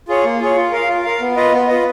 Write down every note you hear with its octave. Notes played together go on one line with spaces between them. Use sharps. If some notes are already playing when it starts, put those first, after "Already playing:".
F4 G#4 C#5
A#3
F4 G#4 C#5
F4
A#4 F5
F4
A#4 F5
B3
F4 B4 D#5
B3
F4 B4 D#5